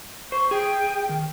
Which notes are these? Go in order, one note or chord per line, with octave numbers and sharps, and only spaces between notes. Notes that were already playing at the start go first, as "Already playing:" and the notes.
C5 C#6
G#4 G5
D#3